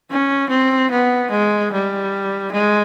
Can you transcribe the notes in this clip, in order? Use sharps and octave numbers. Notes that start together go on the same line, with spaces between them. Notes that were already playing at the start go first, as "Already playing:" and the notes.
C#4
C4
B3
G#3
G3
G#3